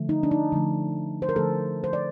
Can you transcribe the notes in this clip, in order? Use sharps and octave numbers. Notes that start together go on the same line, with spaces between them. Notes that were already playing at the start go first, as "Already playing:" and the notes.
Already playing: D3 F3 A3
D#4
D4
D#4
D3 F3 A3
C5
A#4
D3 F3 A3 A4
C5
D5